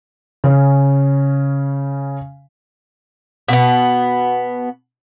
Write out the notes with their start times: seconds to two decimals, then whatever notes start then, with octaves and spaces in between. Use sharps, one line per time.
0.44 C#3 C#4
3.48 B2 B3